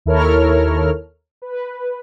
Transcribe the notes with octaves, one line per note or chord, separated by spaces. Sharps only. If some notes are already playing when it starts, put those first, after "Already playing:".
D#2 E4 A4 A#4 C#5 F6
B4